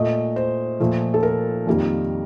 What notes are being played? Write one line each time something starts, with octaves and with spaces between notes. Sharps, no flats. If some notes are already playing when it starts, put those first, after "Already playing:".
Already playing: A#2 A3 D#5
C5
A#2 F3 A3
A4
A#4
F2 D#3 G3 A#3